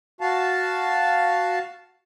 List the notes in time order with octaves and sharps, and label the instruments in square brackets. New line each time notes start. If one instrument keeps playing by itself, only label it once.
[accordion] F#4 F5 A5